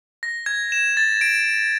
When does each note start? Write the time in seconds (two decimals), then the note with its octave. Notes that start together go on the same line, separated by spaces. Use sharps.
0.23 A#6
0.46 G#6
0.72 E7
0.97 A6
1.21 D7